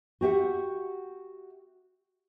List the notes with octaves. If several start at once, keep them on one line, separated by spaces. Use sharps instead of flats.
F#4 G4 E5 F#5